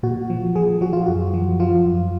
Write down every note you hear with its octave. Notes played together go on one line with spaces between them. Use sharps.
A#2 F#4
F3
F3 G#4
F3 F#4
F4
F#2 F#4
F3
F3 F4
F#2